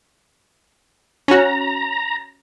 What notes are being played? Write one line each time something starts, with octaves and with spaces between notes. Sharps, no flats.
C#4 F#4 A#5